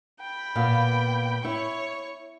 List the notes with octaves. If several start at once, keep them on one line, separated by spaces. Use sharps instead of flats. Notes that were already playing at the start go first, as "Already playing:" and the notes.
G5 B5
A#2 B3 F5
E4 C#5 C#6